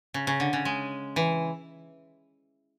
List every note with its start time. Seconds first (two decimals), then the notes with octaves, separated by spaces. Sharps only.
0.14 C#3
0.27 C#3
0.40 D3
0.53 C#3
0.65 G#3
1.16 E3